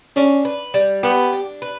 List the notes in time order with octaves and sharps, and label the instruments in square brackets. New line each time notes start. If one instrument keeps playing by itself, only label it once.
[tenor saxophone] C#4 [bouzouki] D4
[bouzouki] B4
G3
[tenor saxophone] B3 [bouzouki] G4
[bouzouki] D4
B4